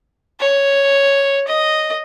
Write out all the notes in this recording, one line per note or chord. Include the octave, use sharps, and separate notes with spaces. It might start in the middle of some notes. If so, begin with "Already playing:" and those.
C#5
D#5